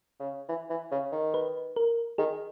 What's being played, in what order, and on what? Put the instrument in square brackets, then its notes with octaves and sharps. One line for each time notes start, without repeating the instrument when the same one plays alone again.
[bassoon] C#3
E3
E3
C#3
D#3
[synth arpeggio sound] B4
A#4
[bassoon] D#3 [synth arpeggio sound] G#4